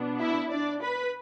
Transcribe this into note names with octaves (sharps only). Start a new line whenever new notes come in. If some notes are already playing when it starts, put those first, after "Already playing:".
Already playing: B2 B3 D4
E4 E5
D4 D5
B4 B5